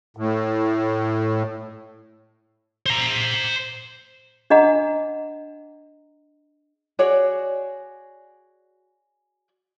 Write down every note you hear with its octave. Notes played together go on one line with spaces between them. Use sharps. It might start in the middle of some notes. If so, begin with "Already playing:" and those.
A2
C5 A#5
D4 G#4 D#5 F#5 A#5
F#4 G#4 C#5 D5